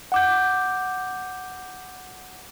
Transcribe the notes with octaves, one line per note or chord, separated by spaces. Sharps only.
F#5 D6 G6